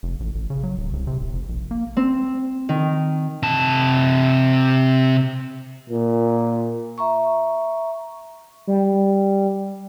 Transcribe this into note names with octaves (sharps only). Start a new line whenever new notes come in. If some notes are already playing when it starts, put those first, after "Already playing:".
F1
A1
A1
C#3
F#3
D1
C2
C3
D#1
F1
A#1
A#3
C4
D#3
C3 A5
A#2
E5 A#5 C#6
G3